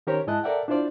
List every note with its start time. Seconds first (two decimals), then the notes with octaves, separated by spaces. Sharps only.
0.07 D#3 C#4 G4 A#4 C5 C#5
0.27 G#2 G#3 E4 D#5 A5 F#6
0.43 A4 A#4 D5 E5 F#5 G5
0.68 D4 E4 F4 C5 D5